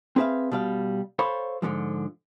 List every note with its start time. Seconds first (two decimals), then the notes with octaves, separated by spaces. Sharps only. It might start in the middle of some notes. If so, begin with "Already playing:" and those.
0.16 C4 G#4 B4 C#5 E5 F5
0.52 B2 G3 F5
1.19 A4 C5 C#5 F5 B5
1.62 G#2 D3 E3 F3